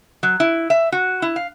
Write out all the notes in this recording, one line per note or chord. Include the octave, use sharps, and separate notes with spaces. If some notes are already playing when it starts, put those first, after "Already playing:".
F#3
E4
E5
F#4
E4
F5